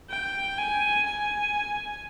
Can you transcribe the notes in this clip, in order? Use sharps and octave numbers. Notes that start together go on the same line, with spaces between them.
G5
G#5
G#5